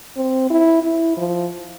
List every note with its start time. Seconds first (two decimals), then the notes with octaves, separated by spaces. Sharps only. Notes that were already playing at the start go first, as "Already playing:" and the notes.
0.17 C4
0.50 E4
0.83 E4
1.17 F3